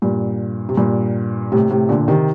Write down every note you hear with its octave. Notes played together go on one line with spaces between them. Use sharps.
G2 A#2
C3
G2 A#2
A2 C3
A2 C3
A#2 D3
C3 D#3